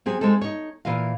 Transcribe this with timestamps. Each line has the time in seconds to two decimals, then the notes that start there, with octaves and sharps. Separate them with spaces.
0.06 F#3 C4 G#4
0.21 G#3 C4 D#4 A4
0.41 D#4 C#5
0.85 A#2 E3 F4 A#4 F5